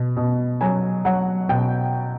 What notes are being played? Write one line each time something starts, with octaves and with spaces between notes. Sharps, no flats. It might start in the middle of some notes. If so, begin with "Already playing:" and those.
Already playing: B2
B2
F#3 G#5
F#3 F#5
B2 G5